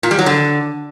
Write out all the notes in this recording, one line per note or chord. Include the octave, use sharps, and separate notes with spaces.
A#2
G3
F#3
D3